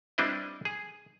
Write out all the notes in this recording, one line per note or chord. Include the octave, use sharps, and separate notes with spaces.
G3 C4 D4 E4 B4 D#5
G#4